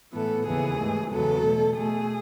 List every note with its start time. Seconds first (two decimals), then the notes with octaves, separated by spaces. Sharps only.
0.13 A2 E3 B3 A4
0.45 D#2 C#3 E3 B3 G#4
0.78 G#2 E3 A3
1.11 E2 C#3 F#3 B3 A4
1.43 B2 A3
1.75 B2 A3 G#4